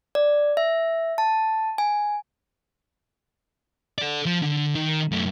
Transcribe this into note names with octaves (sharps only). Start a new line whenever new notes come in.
D5
E5
A5
G#5
A4 D5
F3
D3
D#3
F#2 A3